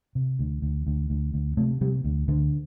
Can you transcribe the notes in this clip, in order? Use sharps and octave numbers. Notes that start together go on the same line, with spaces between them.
C3
D2
D2
D2
D2
D2
C3 A3
C3 G3
D2
D2 D3